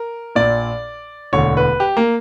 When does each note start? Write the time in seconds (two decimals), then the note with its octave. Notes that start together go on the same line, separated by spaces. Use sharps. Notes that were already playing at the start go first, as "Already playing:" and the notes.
Already playing: A#4
0.35 A#1 A#2 D5
1.33 E1 D2 D3 C#5
1.57 B4
1.80 G4
1.97 A#3